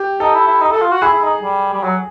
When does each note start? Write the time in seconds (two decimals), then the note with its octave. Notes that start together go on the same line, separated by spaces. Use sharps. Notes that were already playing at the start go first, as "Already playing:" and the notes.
Already playing: G4
0.20 D#4 A4
0.34 E4
0.48 E4
0.61 D#4
0.72 A4
0.81 F4
0.92 F#4
1.02 E4 G#4
1.13 E4
1.22 D#4
1.42 G3
1.74 G3
1.84 F#3